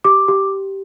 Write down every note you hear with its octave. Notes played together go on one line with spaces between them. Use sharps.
G4 D6
G4